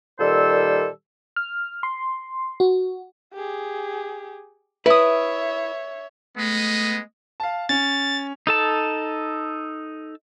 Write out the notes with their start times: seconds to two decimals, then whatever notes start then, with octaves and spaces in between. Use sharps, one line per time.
0.18 A#2 D#3 G3 A4 C5 E6
1.36 F6
1.83 C6
2.60 F#4
3.34 G4 G#4
4.86 E4 B4 C#5 E5 D#6
6.38 G#3 A3 B3 D#5
7.40 F5 A5
7.69 C#4 A6
8.47 D#4 A4 A5